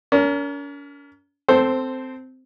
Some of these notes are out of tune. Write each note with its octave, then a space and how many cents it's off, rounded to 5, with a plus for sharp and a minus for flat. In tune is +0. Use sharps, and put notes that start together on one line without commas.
C#4 +45 A#4 +0
C4 -15 A4 +0 C5 +0